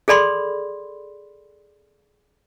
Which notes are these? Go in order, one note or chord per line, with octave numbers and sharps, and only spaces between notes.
G#4 A4 D5 B5 C6